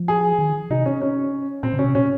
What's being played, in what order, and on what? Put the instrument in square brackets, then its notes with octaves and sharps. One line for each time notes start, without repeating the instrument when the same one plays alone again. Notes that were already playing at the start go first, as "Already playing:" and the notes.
Already playing: [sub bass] F3
[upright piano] G#4
[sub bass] D#3
[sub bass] C3 [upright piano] D#4
[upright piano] C#4
C#4
[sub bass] A#2 [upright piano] C4
[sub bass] C#3
[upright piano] C#4
[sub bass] C3
[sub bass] A#2 [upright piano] C#4